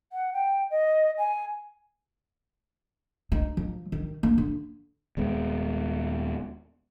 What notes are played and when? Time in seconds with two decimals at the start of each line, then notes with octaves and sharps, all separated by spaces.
0.13 F#5
0.33 G5
0.71 D#5
1.18 G#5
3.32 D#4
3.57 F3
3.92 D#3
4.23 A#3
4.38 D3
5.17 D#1 G#3 B3